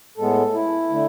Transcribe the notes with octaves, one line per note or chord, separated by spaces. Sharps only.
A2 G#3 B3 A4
E4
D3 A3